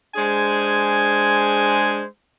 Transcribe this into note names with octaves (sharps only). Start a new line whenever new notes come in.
G#3 D4 G#4 C5 G#5